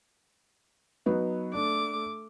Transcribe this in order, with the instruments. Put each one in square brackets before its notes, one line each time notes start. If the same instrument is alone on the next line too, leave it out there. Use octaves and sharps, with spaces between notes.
[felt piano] F#3 B3 D#4
[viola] A3 D6 [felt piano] D4